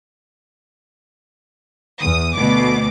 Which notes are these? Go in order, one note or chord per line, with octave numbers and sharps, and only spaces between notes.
E2 D#6
D2 B2 D6